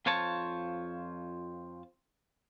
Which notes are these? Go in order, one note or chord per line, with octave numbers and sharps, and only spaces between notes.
F2 F4 C5 C#5 A5